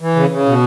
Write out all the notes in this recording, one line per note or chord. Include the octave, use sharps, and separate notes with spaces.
E3
C#3
C#3
B2